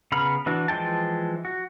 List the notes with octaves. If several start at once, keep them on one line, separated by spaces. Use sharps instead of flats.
C#3 B3 A#5 B5 F6
E3 D4 F#4
E3 F3 G#3 G5 A5
F#4